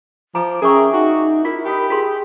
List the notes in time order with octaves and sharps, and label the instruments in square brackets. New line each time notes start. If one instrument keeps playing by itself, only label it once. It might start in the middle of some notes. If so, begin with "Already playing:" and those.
[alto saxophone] F3 [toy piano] A#5 [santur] D6
[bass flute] C#4 [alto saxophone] G#4 [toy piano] A#4 C#6 [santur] E5 G5 A#5
[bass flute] D#4 [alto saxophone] F#4
[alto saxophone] E4 [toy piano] F4 [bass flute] A#4
[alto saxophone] G4 [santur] D#5 B5 C#6
[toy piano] F4 A#4 C6 [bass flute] G#4